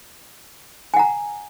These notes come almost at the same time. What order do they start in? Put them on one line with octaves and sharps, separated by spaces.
G#5 F#5 A#5